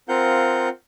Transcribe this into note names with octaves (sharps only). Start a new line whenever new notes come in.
C4 F4 A#4 F5 F#5 G6